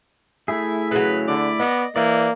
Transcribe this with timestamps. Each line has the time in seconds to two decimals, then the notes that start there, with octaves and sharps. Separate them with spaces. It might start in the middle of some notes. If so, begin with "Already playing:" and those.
0.48 A3 E4 G#4 E5
0.91 C#3 F#3 B4
1.28 D3 D5
1.60 B3 D#5
1.96 E3 A#3 D5